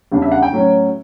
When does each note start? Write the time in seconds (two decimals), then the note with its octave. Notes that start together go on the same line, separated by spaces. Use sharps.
0.12 E2 C#3 G3 D4
0.22 E5
0.32 F#5
0.42 G5
0.53 A2 F#3 C#4